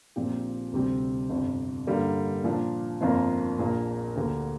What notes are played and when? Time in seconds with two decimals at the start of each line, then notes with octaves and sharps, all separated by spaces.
0.16 A#1 A#2 F3 C4 G4
0.72 D2 C3 G3 C4
1.29 G1 F2 C3
1.87 G2 D3 G3 A#3
2.44 A#2 F3 D4
3.01 G1 F2 F3 A#3
3.58 A#1 A#2 A#3
4.16 D2 D3 A#3 G4